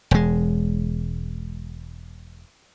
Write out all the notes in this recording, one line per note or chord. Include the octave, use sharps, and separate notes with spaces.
E1 G#3